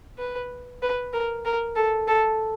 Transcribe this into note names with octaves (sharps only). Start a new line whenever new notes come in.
B4
B4
A#4
A#4
A4
A4